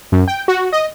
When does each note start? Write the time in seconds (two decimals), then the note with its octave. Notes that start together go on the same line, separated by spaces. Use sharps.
0.12 F#2
0.28 G5
0.48 F#4
0.73 D#5